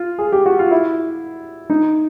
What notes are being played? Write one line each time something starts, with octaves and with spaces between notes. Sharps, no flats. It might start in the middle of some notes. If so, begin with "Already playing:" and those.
Already playing: F4
G#4
G4
F#4
F4
E4
D#4